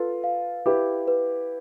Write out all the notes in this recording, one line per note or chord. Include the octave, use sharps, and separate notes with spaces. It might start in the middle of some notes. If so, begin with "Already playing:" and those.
Already playing: F4 A4 B4
F5
E4 G4 B4
B4